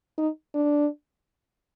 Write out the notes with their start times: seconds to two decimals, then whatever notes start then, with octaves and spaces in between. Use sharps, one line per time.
0.18 D#4
0.54 D4